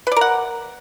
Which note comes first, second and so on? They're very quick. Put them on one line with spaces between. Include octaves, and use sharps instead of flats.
B4 D5 A#4 F#5